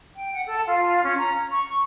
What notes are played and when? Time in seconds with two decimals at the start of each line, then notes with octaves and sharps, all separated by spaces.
0.15 G5
0.32 F#5
0.45 A4
0.67 F4
1.03 C#4
1.17 A#5
1.50 C#6